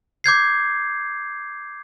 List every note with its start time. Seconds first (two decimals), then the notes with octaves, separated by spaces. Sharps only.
0.24 D6 G6 G#6 C7